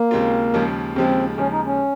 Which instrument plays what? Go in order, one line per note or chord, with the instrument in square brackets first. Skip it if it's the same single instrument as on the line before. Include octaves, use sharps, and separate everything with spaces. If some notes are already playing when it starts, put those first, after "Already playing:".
Already playing: [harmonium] A#3
[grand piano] D#2 C#3 G#3 C4 F4
D#2 C#3 F3 G#3
[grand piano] D#2 C#3 F3 G#3 [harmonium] C4
[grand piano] D#2 C#3 F3 G#3 [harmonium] C#4
[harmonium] D#4
C#4